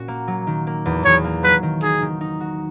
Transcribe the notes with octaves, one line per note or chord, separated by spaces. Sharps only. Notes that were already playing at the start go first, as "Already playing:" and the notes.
Already playing: A#2 C#4 F#4
A#3
F#3
D#3
A#3
E2
E2 C#5
A#3
F#3 B4
D#3
D#4 G#4
D#3
D#4
F#4